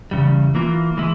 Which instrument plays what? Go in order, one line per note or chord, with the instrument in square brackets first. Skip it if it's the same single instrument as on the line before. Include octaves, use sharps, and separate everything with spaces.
[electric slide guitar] E2 C#3 G3
E3 A#3 F4
E3 G#3 E4